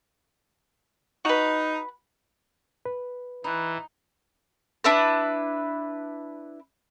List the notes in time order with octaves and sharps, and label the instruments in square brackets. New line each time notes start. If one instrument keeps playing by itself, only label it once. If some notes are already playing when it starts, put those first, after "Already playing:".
[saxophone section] D#4 [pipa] F#4 B4
[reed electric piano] B4
[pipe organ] E3 [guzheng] D#4 [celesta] B5 F#6
[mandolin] D4 E4 B4